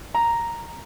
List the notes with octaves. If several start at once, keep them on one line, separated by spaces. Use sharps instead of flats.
A#5